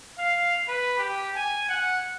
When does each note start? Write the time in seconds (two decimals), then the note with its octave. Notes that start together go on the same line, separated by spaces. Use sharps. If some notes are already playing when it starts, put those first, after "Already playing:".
0.18 F5
0.68 B4
0.98 G4
1.36 G#5
1.69 F#5